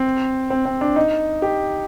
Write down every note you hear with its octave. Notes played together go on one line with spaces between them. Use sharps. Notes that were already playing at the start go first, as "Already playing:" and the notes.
Already playing: C4
C4
C4
D4
D#4
G4